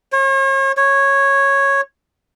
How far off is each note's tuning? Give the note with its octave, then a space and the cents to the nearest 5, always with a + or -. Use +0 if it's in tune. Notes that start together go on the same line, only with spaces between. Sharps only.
C#5 -40
C#5 -10